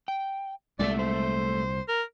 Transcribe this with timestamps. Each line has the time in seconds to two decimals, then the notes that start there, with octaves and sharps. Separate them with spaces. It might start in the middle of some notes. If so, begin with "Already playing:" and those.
0.08 G5
0.79 C2 A#2 G#3 A3 D5 E5
0.99 C5
1.88 A#4